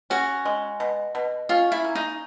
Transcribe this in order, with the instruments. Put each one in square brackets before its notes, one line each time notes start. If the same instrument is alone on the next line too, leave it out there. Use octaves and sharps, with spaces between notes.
[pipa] C#4 [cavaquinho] F#4
[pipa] G#3
B2
B2
[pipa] C#4 [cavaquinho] F4
[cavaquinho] E4
[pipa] A#3
[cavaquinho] D#4